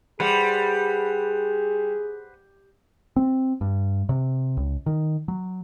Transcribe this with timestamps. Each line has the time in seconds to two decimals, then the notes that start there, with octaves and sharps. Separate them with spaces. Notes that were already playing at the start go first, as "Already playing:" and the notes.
0.20 G3 G#4 B4 C5 F#5
3.16 C4
3.61 G2
4.09 C3
4.57 C#2
4.86 D#3
5.28 F#3